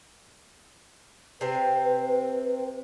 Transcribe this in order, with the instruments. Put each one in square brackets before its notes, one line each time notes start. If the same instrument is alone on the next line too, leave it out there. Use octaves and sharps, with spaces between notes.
[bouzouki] C3 C4 [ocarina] B4